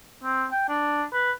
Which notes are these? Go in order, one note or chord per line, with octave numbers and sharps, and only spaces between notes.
C4
G5
D4
B4